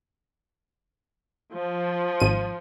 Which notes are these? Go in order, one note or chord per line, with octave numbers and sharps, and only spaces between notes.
F3
G#1 D#7